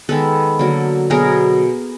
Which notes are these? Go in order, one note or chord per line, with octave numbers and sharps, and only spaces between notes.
D#3 G#3 B3 A4 B4
D3 F#3 A#3
B2 F#3 B3 G#4 A#4